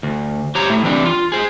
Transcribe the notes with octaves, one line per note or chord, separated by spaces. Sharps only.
D2
G4 C5 C#5 A#5
A2 A3
E3 G3 C4 D4
F4
G#4 C5